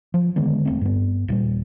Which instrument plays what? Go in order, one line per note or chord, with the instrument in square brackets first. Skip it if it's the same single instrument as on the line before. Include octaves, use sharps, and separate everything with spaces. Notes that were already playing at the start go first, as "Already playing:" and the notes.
[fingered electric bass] F3
D3 D#3 G#3 B3
D#1 A3 C4
G2 B3
D#1 A#2 G3